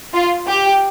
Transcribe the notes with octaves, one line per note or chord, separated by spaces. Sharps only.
F4
G4